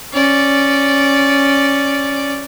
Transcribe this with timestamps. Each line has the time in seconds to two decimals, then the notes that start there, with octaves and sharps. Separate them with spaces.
0.13 C#4 D5